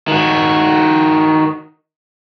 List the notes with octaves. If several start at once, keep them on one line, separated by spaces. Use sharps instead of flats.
D#3 F#4